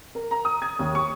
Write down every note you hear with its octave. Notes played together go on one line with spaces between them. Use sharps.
A#4
A#5
D#6
G#6
D#2
C#6